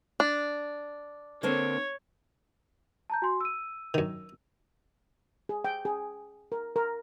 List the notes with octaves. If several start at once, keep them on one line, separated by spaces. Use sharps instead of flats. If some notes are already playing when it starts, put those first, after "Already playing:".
D4
D3 A#3 C4 C#5
A5 A#5 G6
F#4 G#5 C6
E6 D#7
F#2 D#3
G#4
G5
G#4
A#4
A#4